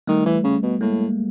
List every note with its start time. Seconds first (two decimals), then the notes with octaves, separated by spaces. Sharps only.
0.07 D#3 G3 A3
0.26 E3
0.44 C#3
0.63 B2
0.81 A2 G#3 A#3